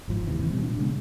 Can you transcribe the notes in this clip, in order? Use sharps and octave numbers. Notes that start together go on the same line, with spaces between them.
G1 G#2 F3
D#2 C3 E3
B2 G3
A#2 D4
C#3 G#3 B3